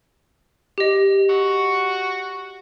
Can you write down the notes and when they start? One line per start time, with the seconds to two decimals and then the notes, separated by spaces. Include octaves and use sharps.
0.78 G4 D#5
1.29 F#4